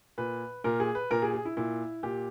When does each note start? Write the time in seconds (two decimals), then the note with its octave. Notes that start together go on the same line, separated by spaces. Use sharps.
0.18 A#2 B4
0.64 A#2 A#4
0.80 G#4
0.95 B4
1.11 A#2 A#4
1.22 G#4
1.34 G#4
1.45 E4
1.57 A#2 E4
2.03 A#2 G4